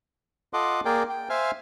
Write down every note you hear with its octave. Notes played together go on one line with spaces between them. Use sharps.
F4 A4 D#5 F#5 C6 D6
A#3 G#4 A#4 D5 G5
G5
C5 E5 F5 G#5 F6